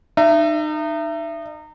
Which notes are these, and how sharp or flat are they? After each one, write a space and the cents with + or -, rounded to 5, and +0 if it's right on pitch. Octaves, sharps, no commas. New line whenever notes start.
D#4 -30 E5 +25